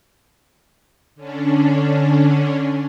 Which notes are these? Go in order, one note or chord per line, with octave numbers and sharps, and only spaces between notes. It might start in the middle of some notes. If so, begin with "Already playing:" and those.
D3 C#4 D4